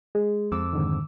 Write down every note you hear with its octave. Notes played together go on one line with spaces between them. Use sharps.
G#3 G#4
F2 D6 E6
G#2 D3 D#3